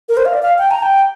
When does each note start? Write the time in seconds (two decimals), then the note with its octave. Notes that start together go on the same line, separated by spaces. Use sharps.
0.09 A#4
0.17 C5
0.25 F5
0.33 D5
0.43 F5
0.58 G5
0.71 A#5
0.82 G5